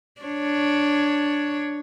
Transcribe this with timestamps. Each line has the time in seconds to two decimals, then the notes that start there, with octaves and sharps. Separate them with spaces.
0.21 D4 C#5